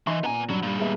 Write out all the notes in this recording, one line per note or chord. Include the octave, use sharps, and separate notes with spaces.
E3 D#4 E5 C6
A#2 B3 G#5 A#5
G2 F#3
A#2 G3
G#3 B3 E5